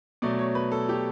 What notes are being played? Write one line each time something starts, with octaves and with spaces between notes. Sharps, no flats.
B2 F#3 A3 D5
C#5
B4
A4
G4